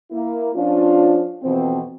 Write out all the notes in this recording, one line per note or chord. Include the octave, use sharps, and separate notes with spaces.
A#3 E4
F3 C#4 D4 F4
F2 B2 E3 C4